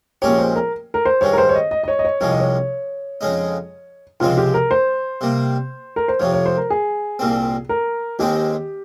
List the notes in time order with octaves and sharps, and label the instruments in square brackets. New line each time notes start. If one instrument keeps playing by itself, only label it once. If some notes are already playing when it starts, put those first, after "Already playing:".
[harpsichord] A#1 A#2 G#3 C#4 G4 [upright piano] C#5
[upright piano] C5
A#4
A#4
C5
[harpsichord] G2 D#3 G#3 [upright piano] C#5
[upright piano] A#4
C5
C#5
D#5
D#5
D#5
C#5
D#5
C#5
[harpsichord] C2 C3 F3 G#3 [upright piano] C#5
[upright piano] D#5
C#5
[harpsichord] F2 C#3 G#3 D#4
[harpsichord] C#2 C3 F3 G#3 C4 [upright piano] F4
[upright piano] G4
A#4
C5
[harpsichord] C3 G3 A#3
[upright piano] A#4
C5
[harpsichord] F2 C3 F3 [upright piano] C#5
[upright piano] C#5
C5
A#4
G#4
[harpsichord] C2 A#2 G3 C4
[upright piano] A#4
[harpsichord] D#2 D#3 G#3 C4 D#4 [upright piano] G4